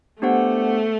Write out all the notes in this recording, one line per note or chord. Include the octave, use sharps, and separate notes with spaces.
A3 B3 D4 G4 C5 F#5